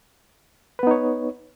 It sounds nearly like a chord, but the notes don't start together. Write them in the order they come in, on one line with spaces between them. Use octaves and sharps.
B4 B3 D#4 C#5